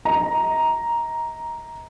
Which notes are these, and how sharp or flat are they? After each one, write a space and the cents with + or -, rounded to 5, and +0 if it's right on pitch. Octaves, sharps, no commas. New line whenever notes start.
D#5 +35 A#5 +5